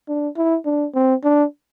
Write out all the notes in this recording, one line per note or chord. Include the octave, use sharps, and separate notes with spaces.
D4
E4
D4
C4
D4